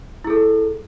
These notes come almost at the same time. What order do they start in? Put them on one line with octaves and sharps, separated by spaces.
E4 G#4 A4